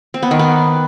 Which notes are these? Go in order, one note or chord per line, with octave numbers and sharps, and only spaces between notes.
C4
B3
D#3
B3